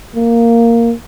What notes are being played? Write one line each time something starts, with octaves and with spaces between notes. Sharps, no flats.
A#3